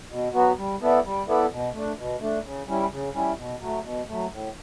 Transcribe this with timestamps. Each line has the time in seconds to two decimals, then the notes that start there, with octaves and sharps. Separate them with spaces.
0.10 B2
0.33 F#3 B3 F#4
0.57 G3
0.81 B3 E4 A4 D5
1.04 G3
1.27 B3 E4 A4 D5
1.51 B2
1.74 A3 D4
1.97 B2
2.20 A3 D4
2.44 C#3
2.67 G3 C#4 E4
2.91 C#3
3.14 G3 C#4 E4
3.36 B2
3.60 F#3 A3
3.83 B2
4.08 F#3 A3
4.31 A2